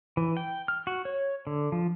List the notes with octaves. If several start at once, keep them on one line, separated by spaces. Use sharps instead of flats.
E3
G5
F6
F#4
C#5
D3
F3